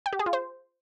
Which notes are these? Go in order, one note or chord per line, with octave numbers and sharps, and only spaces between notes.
G5
G4
G#4
F4
C5